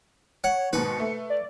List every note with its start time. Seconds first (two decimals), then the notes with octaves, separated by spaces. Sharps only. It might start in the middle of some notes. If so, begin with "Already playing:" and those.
0.44 C#5 F#5
0.73 G#2 B2 D#3 B4 C#7
1.00 A3
1.30 D5